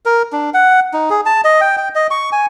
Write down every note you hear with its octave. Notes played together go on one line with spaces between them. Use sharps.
A#4
D4
F#5
D#4
G#4
A5
D#5
G5
G5
D#5
C#6
G#5